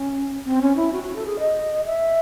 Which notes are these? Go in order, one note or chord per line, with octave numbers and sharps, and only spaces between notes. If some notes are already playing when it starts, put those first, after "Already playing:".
Already playing: C#4
C4
C#4
E4
F#4
F#4
A4
G#4
D#5
E5